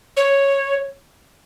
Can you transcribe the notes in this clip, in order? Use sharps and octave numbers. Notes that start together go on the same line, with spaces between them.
C#5